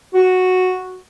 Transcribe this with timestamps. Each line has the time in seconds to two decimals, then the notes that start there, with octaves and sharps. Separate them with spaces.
0.14 F#4